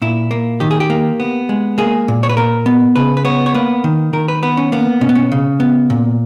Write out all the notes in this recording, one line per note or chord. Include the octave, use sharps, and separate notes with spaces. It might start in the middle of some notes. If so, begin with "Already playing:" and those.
A#2 E4
A#3
D#3 G4
G#4
G4
A#3
B3
G#3
A#3 G#4
A#2
C#5
B4
A#2 A#4
B3
C#3 B4
B4
B3 C#5
C#5
A#3 B4
D#3
D#3 A#4
B4
B3 B4
C#4
A#3 B3
B2 C#4
B3
C#4
C#3
B3
A#2